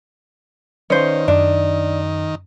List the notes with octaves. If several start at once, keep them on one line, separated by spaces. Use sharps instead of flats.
D#3 C#4 B4 C5 D5 F5
F#2 D4